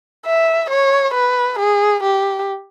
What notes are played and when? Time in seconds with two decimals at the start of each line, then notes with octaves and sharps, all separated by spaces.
0.26 E5
0.70 C#5
1.14 B4
1.59 G#4
2.04 G4